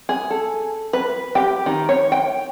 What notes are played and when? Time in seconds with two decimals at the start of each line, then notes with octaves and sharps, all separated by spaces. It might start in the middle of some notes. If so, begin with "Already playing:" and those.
0.09 G#4
0.31 A4
0.93 B4
1.35 G4
1.66 D#3
1.89 C#5
2.12 G5